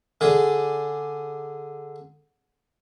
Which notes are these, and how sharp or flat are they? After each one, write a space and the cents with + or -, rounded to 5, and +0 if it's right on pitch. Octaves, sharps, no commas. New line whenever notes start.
D3 +0 G#4 +0 D5 +5